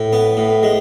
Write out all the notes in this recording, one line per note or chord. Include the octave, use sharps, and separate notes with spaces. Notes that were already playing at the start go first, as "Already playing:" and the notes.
Already playing: A2
B3
A2
G#3